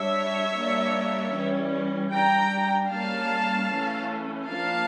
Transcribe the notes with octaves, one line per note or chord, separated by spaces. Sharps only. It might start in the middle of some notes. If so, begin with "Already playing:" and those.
Already playing: G3 D4 C#5 E5
G3 A#3 D4
E3 G3 C#4
G3 D4 G5 A#5
G3 A#3 C#4 F5 A5
E3 A3 C#4
F3 A#3 D4 F5 A5